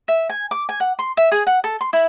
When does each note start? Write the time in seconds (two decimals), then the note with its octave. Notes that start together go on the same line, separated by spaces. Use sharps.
0.08 E5
0.29 G#5
0.51 D6
0.69 G#5
0.80 F#5
0.99 C6
1.17 E5
1.32 G#4
1.47 F#5
1.64 A4
1.81 C6
1.93 E4